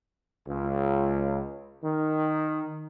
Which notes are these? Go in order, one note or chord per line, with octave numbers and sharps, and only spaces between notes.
C#2
D#3